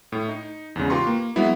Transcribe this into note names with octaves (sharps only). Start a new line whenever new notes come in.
A2
D#4
E2 G#2 C#3
F4 G4 B4 A#5 C6 C#6
A#3
F#3 G#3 B3 E4